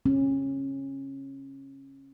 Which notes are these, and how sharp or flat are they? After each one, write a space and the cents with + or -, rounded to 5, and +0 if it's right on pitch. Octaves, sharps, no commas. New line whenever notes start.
C#4 -25